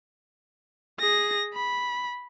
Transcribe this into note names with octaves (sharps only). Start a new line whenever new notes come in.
G#4 A#6
B5